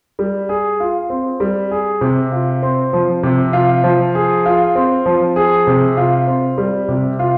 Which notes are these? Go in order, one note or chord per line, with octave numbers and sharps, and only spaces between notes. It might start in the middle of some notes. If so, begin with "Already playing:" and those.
G3
G#4
F4
C4
G3
G#4
C3
F4
C4
F3
C3
F4
F3
G#4
F4
C4
F3
G#4
C3
F4
C4
G3
C3
F4